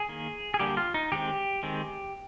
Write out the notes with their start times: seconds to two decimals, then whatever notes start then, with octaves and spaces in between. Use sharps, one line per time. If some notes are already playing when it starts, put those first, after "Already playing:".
Already playing: G#4
0.09 D#3 A#3
0.54 G#4
0.60 D3 G3 A#3 G4
0.77 F4
0.94 D#4
1.12 D#3 G#3 C4 G4
1.63 D#3 G#3 C4